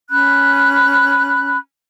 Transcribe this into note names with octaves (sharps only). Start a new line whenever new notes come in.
C#4 B5 F#6